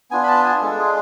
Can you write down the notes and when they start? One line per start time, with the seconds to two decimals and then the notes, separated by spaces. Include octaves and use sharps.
0.11 B3 D4 F4 G#5
0.23 B5
0.28 A5
0.44 G#5
0.62 G#3 D4 F4 A4
0.79 G#4